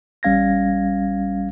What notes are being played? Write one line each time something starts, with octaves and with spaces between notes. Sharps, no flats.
A1 G3 C#4 F5 G#6 A#6